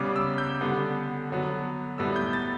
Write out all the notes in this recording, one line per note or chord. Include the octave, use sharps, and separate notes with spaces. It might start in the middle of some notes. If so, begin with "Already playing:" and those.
Already playing: C#3 G3 B3 D6
E6
G6
D3 G3 B3
D3 F#3 B3
A2 G3 B3 E6
G6
A6